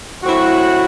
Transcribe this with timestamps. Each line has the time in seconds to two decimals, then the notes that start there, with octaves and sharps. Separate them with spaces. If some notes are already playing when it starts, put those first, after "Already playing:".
0.23 A2 F#3 C4 E4 F#4